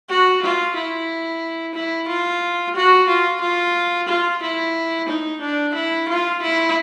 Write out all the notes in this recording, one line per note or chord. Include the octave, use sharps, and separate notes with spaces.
F#4
F4
E4
E4
F4
F#4
F4
F4
F4
E4
D#4
D4
E4
F4
E4